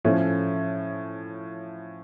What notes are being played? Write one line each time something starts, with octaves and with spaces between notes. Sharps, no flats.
A2 F3 C#4